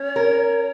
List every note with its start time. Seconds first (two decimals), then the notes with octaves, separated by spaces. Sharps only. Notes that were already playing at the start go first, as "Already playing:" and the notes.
Already playing: C#4 C#5
0.16 A#4